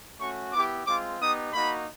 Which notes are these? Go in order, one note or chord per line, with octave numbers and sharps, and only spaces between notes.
A3 C#4 F#4 C#6
B3 E4 G4 D6
G#3 C4 F4 D6
B3 D#4 G4 D#6
A#3 D#4 F#4 B5